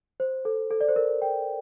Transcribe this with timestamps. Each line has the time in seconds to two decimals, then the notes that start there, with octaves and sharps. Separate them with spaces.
0.20 C5
0.45 A4
0.71 A4
0.81 D5
0.88 C5
0.96 A#4
1.22 G5